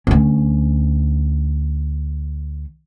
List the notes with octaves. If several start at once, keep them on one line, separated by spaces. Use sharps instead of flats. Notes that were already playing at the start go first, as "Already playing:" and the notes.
D2 C#4